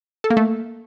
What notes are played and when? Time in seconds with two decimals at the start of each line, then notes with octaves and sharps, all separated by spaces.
0.24 A4
0.30 A#3
0.37 A3